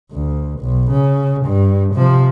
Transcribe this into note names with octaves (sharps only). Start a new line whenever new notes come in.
D2
B1
C#3
G2
C3 F3